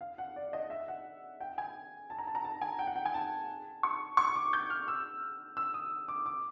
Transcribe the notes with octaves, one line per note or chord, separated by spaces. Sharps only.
F5
F#5
D5
D#5
E5
F#5
G5
G#5
A5
A#5
A5
A#5
A5
G#5
G5
F#5
G5
G#5
A5
C#6
C#6
D6
G6
F6
E6
E6
D#6
D6
D6